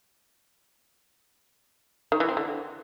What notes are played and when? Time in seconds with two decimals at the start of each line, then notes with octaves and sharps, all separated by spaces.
2.12 D#3
2.20 E3
2.29 C4
2.37 D3